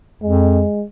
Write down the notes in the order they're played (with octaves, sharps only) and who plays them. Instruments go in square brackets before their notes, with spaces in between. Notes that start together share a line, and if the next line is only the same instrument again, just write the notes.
[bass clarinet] F2 [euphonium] G#3